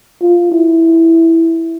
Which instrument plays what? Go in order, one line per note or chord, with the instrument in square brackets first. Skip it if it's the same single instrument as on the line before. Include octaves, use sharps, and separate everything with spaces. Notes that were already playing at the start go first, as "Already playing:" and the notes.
[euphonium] F4
E4